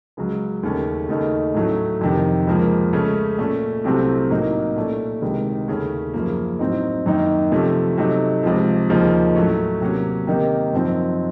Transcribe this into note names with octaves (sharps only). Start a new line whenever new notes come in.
C#2 C#3 F#3
D#2 C#3 A3 C#4
D#2 C#3 A3 D#4
A2 F#3 A3 C#4
F2 C3 D#3
C#2 C#3 F3 A#3
C#2 C#3 A3 C#4
A#2 A3 C#4
C2 C3 F#3 A3 C4
A2 F#3 A#3 D#4
A#2 A3 C#4
C#2 C3 D#3
D#2 C#3 A3 C#4
F#2 C#3 F3 A#3
A2 F#3 C4 D#4
F#2 D#3 A#3 D#4
C3 F3 A3 C#4
C3 F#3 A3 D#4
C#2 C3 F3
D#2 C#3 F3 A#3 D#4
A2 F#3 A3 C#4
C3 F#3 A#3 C#4
C3 D#3 A#3 D#4
F#2 F3 C4 D#4